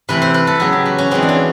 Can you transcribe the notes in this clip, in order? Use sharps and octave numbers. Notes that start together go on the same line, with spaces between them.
C3 E3 A3 C4 B4
C5
B4
A4
C#3 F#3 B3 G#4
G4
F#4
C#4
E3 G#3 B3 C4
D4
C#4